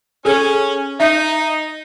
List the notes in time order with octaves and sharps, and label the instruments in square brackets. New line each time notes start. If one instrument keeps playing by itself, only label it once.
[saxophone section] C#4 [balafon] G#4 A4
[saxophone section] D#4 [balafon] E5